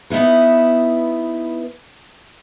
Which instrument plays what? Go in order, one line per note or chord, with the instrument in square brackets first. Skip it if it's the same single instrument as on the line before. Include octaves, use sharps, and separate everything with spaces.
[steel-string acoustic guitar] B3 D#4 E4 B4